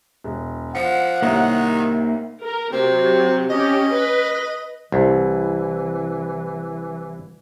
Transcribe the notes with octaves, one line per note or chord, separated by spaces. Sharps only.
E1
F3 F#5 C#7
C2 C3 D#3 A#3 D#4 C#5
A#4
C3 F#3 C4
C#4 G4 D#5
B4
C2 E3